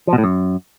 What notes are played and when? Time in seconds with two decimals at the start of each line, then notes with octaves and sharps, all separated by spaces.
0.07 F3
0.13 B2
0.18 A2
0.24 F#2